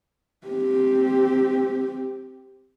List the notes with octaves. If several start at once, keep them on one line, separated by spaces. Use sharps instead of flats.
C4 G4